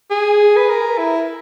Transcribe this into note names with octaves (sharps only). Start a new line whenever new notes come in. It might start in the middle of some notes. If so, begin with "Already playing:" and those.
G#4
B4
A#4
E4